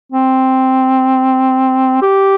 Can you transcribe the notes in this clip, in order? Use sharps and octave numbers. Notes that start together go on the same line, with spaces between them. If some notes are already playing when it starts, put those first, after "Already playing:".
C4
G4